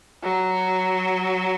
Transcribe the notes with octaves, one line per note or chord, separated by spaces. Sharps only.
F#3